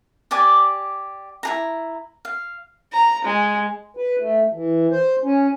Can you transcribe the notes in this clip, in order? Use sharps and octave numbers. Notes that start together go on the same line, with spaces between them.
G4 D5 G#5 D6
E4 G#4 A#5
F5
A#5
G#3
B4
A3
E3
C5
C#4